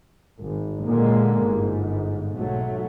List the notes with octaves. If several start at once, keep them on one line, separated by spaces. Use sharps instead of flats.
G#1
A#2 D3 G#3 A#3
G1 G#2
B1 F#3 A3